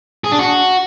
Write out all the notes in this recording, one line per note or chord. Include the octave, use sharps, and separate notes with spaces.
G#4
D4
F#4